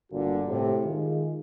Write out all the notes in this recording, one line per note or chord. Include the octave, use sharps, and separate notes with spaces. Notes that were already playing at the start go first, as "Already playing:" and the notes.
G1 A#2 D3 F#4
A2 C3
D#3 G#3 F4 G#4